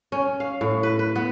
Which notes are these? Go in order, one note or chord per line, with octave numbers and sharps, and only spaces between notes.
C#4
F5
A2
B4
B4
B3